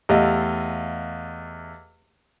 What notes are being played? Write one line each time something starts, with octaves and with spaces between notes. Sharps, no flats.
E2 A3 G4 D#5 F5